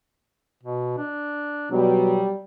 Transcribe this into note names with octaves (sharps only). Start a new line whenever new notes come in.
B2
D4
B2 F#3 G3